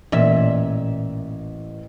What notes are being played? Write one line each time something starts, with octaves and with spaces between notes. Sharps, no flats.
A1 A#2 E5